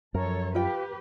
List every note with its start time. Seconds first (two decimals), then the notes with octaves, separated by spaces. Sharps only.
0.14 F#2 F3 A4 A#4 C#5
0.55 F4 G4 B4 G5